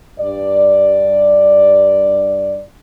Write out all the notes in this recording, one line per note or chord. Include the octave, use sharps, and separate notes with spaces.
G2 D5